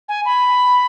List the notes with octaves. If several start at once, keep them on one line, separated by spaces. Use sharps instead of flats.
G#5
B5